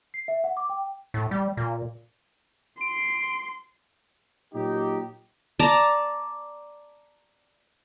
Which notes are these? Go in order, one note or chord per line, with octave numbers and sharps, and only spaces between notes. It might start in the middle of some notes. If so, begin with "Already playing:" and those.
C7
E5
F#5
D6
G5
A2
G3
A#2
C6 D7
A#2 F#3 D#4 G4
D5 A5 A#5